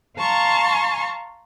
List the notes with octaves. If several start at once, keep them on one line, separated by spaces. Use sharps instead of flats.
F5 A5 A#5 C6 C#6